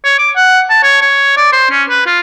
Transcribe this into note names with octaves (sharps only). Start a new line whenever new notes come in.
C#5
D6
F#5
A5
C#5
C#5
D5
C5
C#4
B4
F4